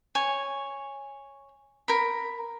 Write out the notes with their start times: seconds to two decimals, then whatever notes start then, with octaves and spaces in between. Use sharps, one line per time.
0.15 C#5 G#5
1.88 A#4 B5